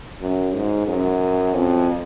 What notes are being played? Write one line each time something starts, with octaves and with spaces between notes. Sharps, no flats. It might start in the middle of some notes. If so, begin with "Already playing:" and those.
F#2
G#2
F#2
F2